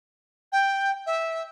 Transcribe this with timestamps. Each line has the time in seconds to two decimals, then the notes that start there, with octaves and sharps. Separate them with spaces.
0.52 G5
1.06 E5